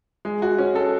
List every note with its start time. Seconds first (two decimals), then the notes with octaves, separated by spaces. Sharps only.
0.25 G#3
0.42 F#4
0.59 C#4
0.75 A4